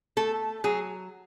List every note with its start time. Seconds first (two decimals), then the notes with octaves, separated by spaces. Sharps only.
0.17 A3 A4
0.64 F#3 G#4